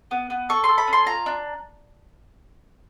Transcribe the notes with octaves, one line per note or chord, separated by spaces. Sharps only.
B3
B3
A4 C#6
A4 C6
B5
C#4
C6
F4 A#5
D4